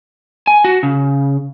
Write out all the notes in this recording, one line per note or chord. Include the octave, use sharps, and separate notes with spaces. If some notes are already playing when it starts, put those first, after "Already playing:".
G#5
F#4
C#3